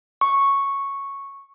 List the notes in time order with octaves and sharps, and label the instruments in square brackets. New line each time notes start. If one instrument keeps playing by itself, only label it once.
[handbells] C#6